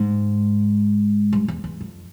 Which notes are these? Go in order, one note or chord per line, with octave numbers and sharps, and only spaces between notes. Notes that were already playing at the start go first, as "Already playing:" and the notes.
Already playing: G#2
G2
E2
E2
F2